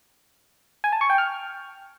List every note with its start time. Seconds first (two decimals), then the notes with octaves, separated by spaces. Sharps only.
0.84 G#5
0.92 A5
1.01 C#6
1.10 G5
1.18 F6